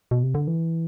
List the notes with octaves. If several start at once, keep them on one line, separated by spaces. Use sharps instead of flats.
B2
C3
D3
E3